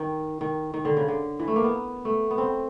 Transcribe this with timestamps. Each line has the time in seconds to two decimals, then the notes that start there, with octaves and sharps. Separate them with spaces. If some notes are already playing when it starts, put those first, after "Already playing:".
Already playing: D#3
0.41 D#3
0.74 D#3
0.85 D3
0.97 C#3
1.08 D3
1.39 E3
1.48 A3
1.56 A#3
1.64 B3
2.05 A3
2.31 B3
2.38 C4